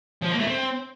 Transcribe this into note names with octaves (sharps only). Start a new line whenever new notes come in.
F3
A#3
A3
C4